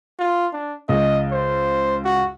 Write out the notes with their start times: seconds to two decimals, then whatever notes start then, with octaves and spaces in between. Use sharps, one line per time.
0.19 F4
0.53 D4
0.89 C#2 D#5
1.32 C5
2.04 F#4